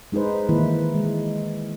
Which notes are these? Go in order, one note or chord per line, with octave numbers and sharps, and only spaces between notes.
G#3 D#4 G#4 B4 C5
D#3 E3 A#3 E4 B4
G#3